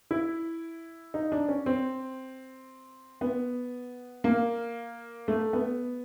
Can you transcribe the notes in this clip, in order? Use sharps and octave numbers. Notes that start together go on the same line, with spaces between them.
E4
D#4
D4
C#4
C4
B3
A#3
A3
B3